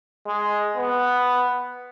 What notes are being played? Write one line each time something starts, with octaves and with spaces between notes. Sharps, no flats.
G#3
B3